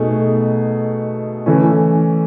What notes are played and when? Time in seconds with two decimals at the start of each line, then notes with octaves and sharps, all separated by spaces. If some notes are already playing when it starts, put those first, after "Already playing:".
Already playing: B2 A3 D#4 G#4
1.46 E3 A3 C#4